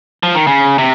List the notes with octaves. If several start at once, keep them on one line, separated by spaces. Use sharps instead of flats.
F3
D#3
C#3
C3